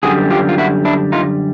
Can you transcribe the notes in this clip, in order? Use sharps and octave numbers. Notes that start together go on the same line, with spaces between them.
F#2 D3 G3 F#4 G#4
F4 G4
F4
E4 F#4
D4 E4
D#4 F4